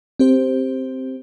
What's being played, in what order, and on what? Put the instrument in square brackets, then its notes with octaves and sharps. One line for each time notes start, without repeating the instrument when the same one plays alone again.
[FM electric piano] C4 G4 C5